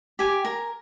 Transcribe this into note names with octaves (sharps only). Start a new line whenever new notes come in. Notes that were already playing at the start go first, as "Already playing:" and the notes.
G4 G#5
A#4